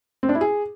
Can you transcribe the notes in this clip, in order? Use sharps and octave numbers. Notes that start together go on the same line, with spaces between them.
C4
D4
E4
G#4